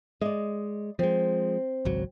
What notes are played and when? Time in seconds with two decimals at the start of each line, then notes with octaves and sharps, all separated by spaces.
0.22 G#3 D5 D#5
0.99 F3 G#3 C4
1.85 G#1 C#2 F#3